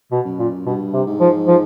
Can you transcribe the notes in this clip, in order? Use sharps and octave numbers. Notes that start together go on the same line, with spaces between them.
B2
F#2
A#2
G2 B2
C3
G#2
F3
F3